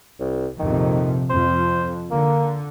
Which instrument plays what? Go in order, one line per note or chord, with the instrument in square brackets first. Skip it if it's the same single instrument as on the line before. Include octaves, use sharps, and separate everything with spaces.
[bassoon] C2
[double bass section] A#1 F2 C3 [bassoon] D#3
[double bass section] F2 [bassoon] C5
[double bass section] D3 [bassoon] A#3